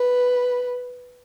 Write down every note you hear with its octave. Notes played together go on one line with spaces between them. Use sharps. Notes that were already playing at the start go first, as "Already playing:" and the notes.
Already playing: B4